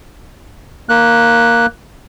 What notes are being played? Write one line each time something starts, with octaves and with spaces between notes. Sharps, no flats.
A#3 F#6